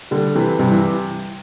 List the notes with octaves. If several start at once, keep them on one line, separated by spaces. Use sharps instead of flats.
D3 G3
C3 E3
G2 C3
E3